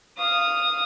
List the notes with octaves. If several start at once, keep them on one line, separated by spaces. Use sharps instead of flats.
F5 D#6